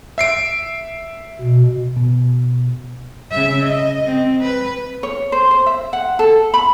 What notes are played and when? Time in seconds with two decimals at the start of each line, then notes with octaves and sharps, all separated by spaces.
0.18 E5 C7 D7
1.41 B2
1.97 B2
3.31 C#3 E5
3.65 D#5
4.06 C4
4.41 B4
5.03 C#5
5.32 C5
5.51 C5
5.66 E5
5.93 F#5
6.19 A4
6.54 B5